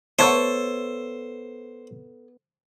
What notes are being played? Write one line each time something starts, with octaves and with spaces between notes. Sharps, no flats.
A3 B3 A4 C5 C#5